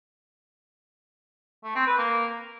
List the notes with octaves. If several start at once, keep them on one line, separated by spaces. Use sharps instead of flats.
A3
C4
B4
A#3